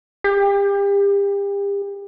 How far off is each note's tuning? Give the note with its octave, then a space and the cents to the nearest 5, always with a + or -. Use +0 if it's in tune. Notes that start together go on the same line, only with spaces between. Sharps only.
G4 +35